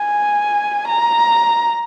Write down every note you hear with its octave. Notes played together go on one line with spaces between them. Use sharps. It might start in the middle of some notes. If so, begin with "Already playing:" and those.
Already playing: G#5
A#5